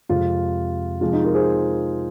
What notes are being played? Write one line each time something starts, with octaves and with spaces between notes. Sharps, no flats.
F2 C3 G#3 F4
C3 F3 G#3 F4
D#4 G#4
F4 A#4
G#4 C5